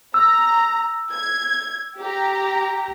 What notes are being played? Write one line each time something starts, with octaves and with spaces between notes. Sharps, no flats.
A#5 E6
G#6
G4 A#5